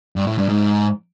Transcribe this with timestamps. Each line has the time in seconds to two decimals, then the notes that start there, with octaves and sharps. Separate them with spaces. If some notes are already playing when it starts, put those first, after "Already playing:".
0.16 G2
0.27 A2
0.38 G2
0.49 G#2